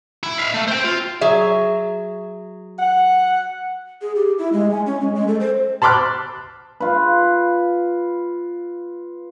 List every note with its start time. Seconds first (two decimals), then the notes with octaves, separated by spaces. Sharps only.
0.23 E4
0.38 E5 F5
0.54 A3
0.68 C5 G5
0.85 F4
1.21 F#3 G#4 E5
2.79 F#5
4.02 G#4
4.16 G4
4.38 E4
4.53 G#3
4.71 G#5
4.86 C#4
5.01 G#3
5.15 G#3
5.28 A4
5.40 C5
5.82 A5 B5 C6 D6 F6 F#6
6.80 F4 B4